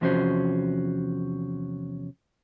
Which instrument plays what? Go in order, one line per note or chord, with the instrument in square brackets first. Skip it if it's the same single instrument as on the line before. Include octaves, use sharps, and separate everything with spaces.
[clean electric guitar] E2 C3 F3 C#4 F#4 C5